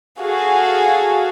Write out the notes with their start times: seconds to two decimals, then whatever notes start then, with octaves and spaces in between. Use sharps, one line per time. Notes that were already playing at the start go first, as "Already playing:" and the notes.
0.21 F#4 G#4 A4 F5